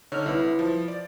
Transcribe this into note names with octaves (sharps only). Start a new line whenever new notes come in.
D3 D#4 C#5 F6
C2 E4 B4
F3
D5